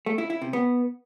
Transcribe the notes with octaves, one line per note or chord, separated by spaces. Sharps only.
A3
E4
E4
C3
B3